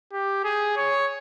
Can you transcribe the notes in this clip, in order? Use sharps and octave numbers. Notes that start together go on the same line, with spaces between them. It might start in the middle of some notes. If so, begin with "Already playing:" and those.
G4
G#4
C#5